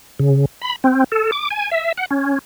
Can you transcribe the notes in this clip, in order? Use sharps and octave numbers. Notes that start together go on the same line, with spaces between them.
C#3
B5
C4
A4
D6
G#5
E5
F#5
C#4